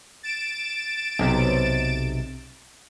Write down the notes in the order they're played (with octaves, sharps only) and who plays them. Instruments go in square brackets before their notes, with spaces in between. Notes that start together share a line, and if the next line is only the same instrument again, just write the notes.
[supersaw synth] A6 D7 E7
[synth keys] B1 C3